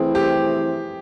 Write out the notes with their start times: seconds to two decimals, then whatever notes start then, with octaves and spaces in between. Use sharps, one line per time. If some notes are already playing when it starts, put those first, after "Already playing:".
Already playing: E3 A3 C4 E4 G#4
0.15 G4